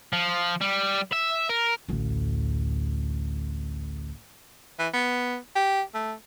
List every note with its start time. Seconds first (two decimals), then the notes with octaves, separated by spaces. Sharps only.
0.13 F3
0.61 G3
1.13 E5
1.49 A#4
1.88 A1 D2
4.79 E3
4.94 B3
5.55 G4
5.95 A3